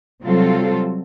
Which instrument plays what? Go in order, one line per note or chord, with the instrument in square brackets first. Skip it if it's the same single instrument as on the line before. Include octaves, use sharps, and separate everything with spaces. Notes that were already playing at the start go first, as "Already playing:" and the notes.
[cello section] C3 F#3 G3 C4 F4 A4